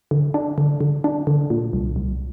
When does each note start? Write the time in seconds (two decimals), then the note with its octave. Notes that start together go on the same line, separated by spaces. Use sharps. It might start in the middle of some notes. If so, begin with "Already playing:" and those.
0.11 D3
0.34 D4
0.58 D3
0.81 D3
1.04 D4
1.27 D3
1.50 A#2
1.73 C2
1.96 C2